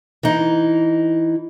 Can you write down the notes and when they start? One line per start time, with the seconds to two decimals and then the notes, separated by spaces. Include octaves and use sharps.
0.23 E3 D#4